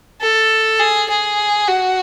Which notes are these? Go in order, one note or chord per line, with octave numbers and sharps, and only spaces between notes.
A4
G#4
G#4
F#4